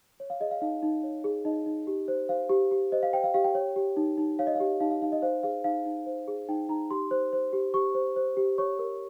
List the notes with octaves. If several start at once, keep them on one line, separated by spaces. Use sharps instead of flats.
C#5
F5
G#4 D#5
F5
D#4 F5
D#4
C#5
G#4
D#4 D#5
D#4
G4
C5
C5 F5
G4
G4
C5 D#5
F5
C5 G5
F5
G4 F5
G5
C#5
G4
D#4
D#4
C#5 F5
D#5
F5
G4
D#4 F5
F5
D#4 F5
D#5
C5 F5
G#4 F5
D#4 F5
D#4
C5
G#4
D#4 G5
D#4 A#5
G4 C6
C5
C5
G4
G4 C#6
C5
C5
G4
C#5 C#6
A#4